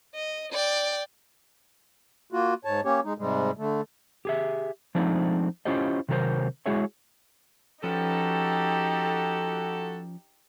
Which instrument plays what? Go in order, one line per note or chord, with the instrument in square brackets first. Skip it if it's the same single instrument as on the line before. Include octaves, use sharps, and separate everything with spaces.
[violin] D#5
D5 G5
[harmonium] A#3 F4 F#4
G#2 C#5 A5
A#3 C#4 G4 C#5
G#3 D#4
G#2 C3 G3 G#3
D3 A3
[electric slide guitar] G4 G#4 E5
F3 G#3 A3 C4 D4 D#4
C#4 E4 F4 G4 C5 D#5
C3 D#3 F#3 F#4 A#4 C5
G#3 E4 F#4 G#4 C#5 E5
[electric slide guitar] F3 C#4 B4 [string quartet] D#4 G4 [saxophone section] F#4 A4